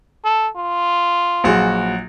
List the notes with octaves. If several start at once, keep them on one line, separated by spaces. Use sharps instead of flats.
A4
F4
A#1 F#3 F#4 G#4 F#5